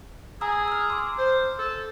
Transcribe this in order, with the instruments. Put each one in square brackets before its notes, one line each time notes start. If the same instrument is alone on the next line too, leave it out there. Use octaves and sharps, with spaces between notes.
[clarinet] G#4 [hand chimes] G#5 A#5 E6
[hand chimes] E6 F6
C6 D6
[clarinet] C5
A4